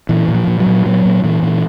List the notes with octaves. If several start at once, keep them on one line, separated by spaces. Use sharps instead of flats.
A#2 E3
A#2
F3
A#2
F#3
A#2
A#2 F#3
A#2
A#2 E3
A#2